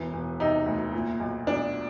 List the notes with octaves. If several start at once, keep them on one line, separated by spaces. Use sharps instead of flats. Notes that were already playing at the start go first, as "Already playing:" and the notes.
Already playing: E1 E3
E1
C3 D#4
D2
A#2
B1
B1 D4